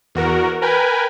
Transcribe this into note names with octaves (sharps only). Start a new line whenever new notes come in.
E2 F#4 A#4
A#4 B4 G5 G#5